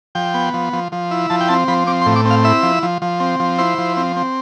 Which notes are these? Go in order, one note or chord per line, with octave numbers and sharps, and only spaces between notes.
F3 G5
B3
F3
F3
F3
E4
F3 A5
G5
C4 A5
F3 B5
C4 D6
C6
A2
D6
C4 F5
E4 E5
F3
F3
F3
C4
F3
E4 C5
F3
C4
C4